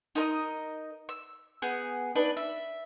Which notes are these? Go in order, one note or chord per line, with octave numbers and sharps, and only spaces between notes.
D#4 A#4 B4 D#5
E6
B3 G#4 G6
D4 D#4 B4
E5